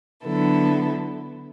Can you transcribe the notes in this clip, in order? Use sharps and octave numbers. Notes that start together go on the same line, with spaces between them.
D3 F#3 B3 E4 A4